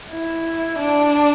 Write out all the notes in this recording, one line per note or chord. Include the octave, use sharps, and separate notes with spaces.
E4
D4